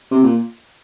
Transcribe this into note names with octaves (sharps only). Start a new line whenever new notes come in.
C3
A#2